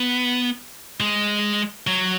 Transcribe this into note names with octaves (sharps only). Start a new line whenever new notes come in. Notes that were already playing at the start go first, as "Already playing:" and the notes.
Already playing: B3
G#3
F#3